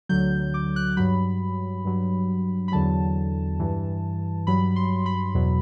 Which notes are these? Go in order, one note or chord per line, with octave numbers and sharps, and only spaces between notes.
D2 D3 F#3 G6
D6
F#6
G2 F#3 B5
G2 F#3
B5
E2 D3 F#3 A5
G2 E3
G2 F#3 B5
C6
B5
E2 B2 F#3